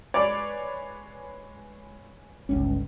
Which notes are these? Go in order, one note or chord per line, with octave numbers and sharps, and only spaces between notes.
G#3 B4 C#5 D5
G1 C#2 C#4